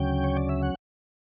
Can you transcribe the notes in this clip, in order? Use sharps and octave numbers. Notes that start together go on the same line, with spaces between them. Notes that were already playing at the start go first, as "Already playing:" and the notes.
Already playing: D2 C#3 F#3 C#4 G5
C#5
D5
E5
F#5